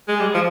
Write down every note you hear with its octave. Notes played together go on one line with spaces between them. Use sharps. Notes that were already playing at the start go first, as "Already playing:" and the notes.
G#3
G3
F3